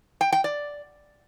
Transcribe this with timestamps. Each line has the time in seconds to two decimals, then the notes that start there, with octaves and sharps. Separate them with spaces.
0.21 G5
0.32 G5
0.44 D5